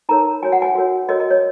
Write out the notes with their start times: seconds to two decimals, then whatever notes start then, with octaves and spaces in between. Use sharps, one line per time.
0.09 D#4 A#4 C#5 A#5
0.43 F#4 C#5 G#5
0.52 F#5
0.62 G#5
0.75 F#4 A#4 C#5
1.09 F#4 A#4 C#5 D#5
1.20 D#5
1.30 C#5